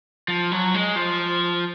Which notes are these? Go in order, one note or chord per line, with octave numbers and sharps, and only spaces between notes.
F3
F#3
G#3
F3